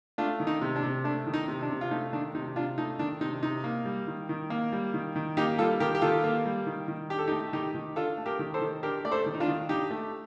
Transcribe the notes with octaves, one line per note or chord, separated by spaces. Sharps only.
A3 D4 F4
D#3
D#4
C3
D4
C3
A3 D4
D#3
D#4
C3
D4
C3
F4
A3 D#4
D#3 D4
C3 D#4
C3 D4 F4
A3 D#4
D#3 D4
C3 D#4
C3 D#4
A#3
G3
D#3
D#3
A#3
G3
D#3
D#3
A#3 D#4 G4
G3 F4 A4
D#3 G4 A#4
G4
D#3 F4 A4
A#3
G3
D#3
D#3
D4 G4
A4
D#4 G4
A3
D#3 D#4 G4
D#3
D4 F4 A4
A3
G4 A#4
D#3
A4 C5
D#3
D4 G4 A#4
A3 D5
A4 C5
D#3
D#4
D4 F4
D#3
D4 D#4 G4
A3